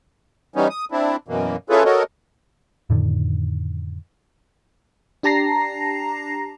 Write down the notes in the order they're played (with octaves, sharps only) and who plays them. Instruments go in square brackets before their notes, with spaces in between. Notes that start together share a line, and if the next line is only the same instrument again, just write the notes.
[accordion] E3 G3 B3 C#4 D#4
D#6
C4 D4 E4
F#2 B2 E3 A#3
C#4 E4 F4 G#4 A4 B4
F#4 A4 A#4 C#5 D#5
[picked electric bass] F2 A2 D3 D#3
[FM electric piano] D4 G4 A5 A#5 A#6 C7